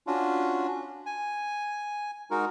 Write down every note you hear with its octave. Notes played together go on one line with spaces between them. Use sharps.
C#4 D4 F4 F#4
G#5
G#3 D#4 F#4 A#4